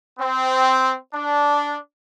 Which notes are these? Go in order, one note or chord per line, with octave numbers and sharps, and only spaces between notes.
C4
D4